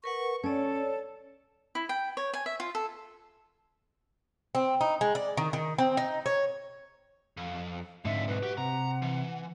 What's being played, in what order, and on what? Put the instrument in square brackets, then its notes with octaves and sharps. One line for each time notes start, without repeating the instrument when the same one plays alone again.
[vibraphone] A#4 B4 F#5 [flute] C#6
[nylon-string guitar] C#4 [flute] A4 [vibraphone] C#5 D5
[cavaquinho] E4
G5
C#5
G#5
E5
F4
A4
[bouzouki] C4
D#4
G#3
D5
D#3
D#3
C4
D#4
C#5
[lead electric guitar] F2
[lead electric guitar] F2 D3 [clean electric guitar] G#2 C4 D#4 [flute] E5
[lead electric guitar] B1 [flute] B4
[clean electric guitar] F#4 [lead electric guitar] G4
[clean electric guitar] C3 [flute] F#5 [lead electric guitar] A#5
[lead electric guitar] E3